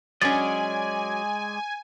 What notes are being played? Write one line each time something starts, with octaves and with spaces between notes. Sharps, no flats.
F#3 G#3 C#4 D5 D#5 G#5 A6